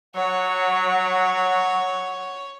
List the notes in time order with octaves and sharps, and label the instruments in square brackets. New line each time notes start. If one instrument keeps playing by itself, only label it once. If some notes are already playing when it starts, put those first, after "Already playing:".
[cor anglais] F#3 [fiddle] C#5 [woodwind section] F#5